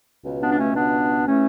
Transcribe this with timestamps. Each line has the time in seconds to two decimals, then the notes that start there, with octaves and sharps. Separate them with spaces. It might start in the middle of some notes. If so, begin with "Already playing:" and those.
0.24 C#2 B2
0.41 B3 D4
0.52 D4
0.58 A3 C#4
0.74 C#2 B2 B3 D4
1.26 C#3 E3 A3 C#4